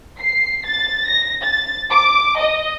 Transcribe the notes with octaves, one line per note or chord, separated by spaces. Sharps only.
C7
A6
A#6
A6
D6
D#5